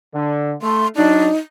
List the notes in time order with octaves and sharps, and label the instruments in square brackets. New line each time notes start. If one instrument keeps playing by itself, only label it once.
[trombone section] D3
[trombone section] A3 [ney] C6
[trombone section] F#3 D4 [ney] D#4